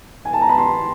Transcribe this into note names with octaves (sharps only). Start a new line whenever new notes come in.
G#5
A5
A#5
B5
C6